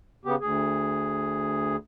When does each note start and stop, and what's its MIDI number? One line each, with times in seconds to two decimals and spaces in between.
0.25 0.35 49
0.25 0.35 59
0.25 0.35 67
0.41 1.76 38
0.41 1.76 68